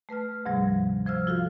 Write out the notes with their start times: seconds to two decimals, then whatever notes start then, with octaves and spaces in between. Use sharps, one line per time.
0.09 A3 B4 A5 F6
0.45 D2 G#2 C3 F3 G3
1.06 F3 C5 E6 F6
1.27 F4 F#4 A4 F5